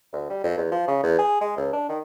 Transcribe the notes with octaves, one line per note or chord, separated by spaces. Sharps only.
D2
G3
F2
E2
F3
C#3
E2
G#4
G#3
C#2
D4
D#3